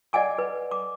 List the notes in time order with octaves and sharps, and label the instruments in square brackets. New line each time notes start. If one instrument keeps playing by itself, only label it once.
[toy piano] D5 D#5 F#5 G#5 D6
B4
D6